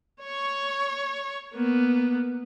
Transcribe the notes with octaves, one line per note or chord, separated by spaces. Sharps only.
C#5 C#6
A#3 B3